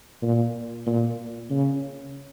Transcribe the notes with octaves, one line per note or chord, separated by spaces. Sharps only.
A#2
A#2
C#3